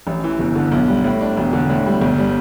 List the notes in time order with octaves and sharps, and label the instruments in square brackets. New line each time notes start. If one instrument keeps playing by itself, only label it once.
[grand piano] A1
E3
G1
D3
B1
G3
A2
D4
E1
D3
A2
G3
G1
G3